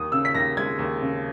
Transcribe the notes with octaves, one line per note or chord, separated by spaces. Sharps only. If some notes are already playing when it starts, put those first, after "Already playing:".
Already playing: D#2 D#6
C#3 E6
B6
D#2 A#6
G#3 G#6
D#2
C#3